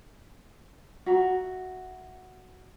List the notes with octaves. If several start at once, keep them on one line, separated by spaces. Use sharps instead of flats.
F#4 E5 A#5